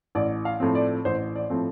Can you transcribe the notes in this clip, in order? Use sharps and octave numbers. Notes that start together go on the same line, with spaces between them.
A1 D5
F5
A2 F3 C4
D5
A1 C5
D5
A2 F3 C4